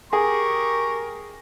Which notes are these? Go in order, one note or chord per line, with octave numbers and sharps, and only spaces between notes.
G4 G#4 A#4 C#6